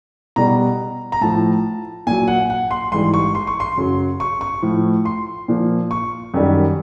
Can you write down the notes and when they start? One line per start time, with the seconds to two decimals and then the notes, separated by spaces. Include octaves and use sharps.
0.36 B2 G3 A#5
1.12 A#5
1.21 A2 F3 A5
2.07 A#2 F#3 G#5
2.28 F#5
2.50 F#5
2.71 C6
2.92 G#2 E3 G3 C6
3.14 C#6
3.35 C6
3.47 C#6
3.60 C6
3.77 F#2 C#3 F#3
4.20 C#6
4.41 C#6
4.62 A2 F3
5.05 C6
5.48 A#2 F3
5.91 C#6
6.34 F#2 D#3 G3